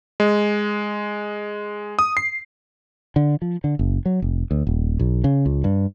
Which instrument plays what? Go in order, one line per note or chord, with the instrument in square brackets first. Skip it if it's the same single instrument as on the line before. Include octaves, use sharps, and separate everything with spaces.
[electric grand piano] G#3
D#6
C7
[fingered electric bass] D3
F3
D3
F#1
F#3
F1
D2
D#1
B1
C#3
C#2
G2